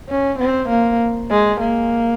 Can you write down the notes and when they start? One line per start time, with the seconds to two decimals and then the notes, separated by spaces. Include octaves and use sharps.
0.09 C#4
0.39 C4
0.69 A#3
1.30 G#3
1.60 A#3